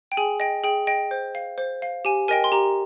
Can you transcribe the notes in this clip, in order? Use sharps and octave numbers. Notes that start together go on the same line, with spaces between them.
G5
G#4 G#5
D#5 G5
G#4 G5
D#5 G5
C5
F5
C5
F5
G4 G#5
A#4 D#5 G5 G#5
C6
G4 A#5